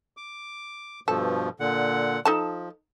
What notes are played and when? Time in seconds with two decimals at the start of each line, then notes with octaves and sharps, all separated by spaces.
0.17 D6
1.08 G2 B2 F3 A4
1.60 A#2 D3 F#5
2.25 F3 D#4 A4 A5